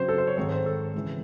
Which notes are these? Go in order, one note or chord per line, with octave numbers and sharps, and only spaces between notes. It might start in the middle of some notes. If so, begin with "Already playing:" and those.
Already playing: C#3 F#3 C4 C5
A4
C5
C#5
G#2 D#3 G#3 C4 C#5
C5
A4
C#3 E3 G#3